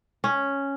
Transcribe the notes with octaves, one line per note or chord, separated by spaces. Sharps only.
C#4